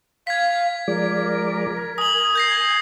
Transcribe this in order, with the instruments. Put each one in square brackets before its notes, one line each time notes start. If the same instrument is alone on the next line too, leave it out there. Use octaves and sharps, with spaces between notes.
[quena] F5 [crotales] G#6 B6
[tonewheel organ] F3 G#3 D5 [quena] A#4
[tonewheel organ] G#5 [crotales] D#6 F#7
[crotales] G6 A#6 C7